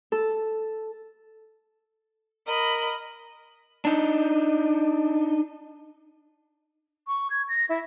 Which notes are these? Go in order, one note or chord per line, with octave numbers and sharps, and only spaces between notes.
A4
A#4 D#5 B5
D4 D#4
C#6
G#6
A#6
E4